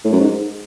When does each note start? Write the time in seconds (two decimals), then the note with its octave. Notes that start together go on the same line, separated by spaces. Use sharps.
0.05 A2
0.13 F#2
0.20 G#2